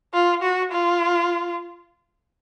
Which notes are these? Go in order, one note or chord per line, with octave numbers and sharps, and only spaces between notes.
F4
F#4
F4